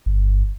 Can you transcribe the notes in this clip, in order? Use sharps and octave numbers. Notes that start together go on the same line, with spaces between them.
G1